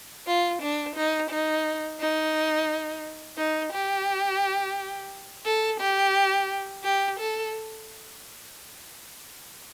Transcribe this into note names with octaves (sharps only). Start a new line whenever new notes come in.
F4
D4
D#4
D#4
D#4
D#4
G4
A4
G4
G4
A4